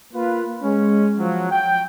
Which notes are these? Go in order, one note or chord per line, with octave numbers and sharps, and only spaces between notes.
A#3 F4 B4
G#3 C#4
F3 F#3
G5